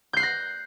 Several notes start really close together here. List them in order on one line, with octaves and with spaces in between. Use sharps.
G6 C7 F#6 A#6